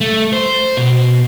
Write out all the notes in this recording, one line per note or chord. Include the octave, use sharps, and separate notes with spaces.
A3
C5
B2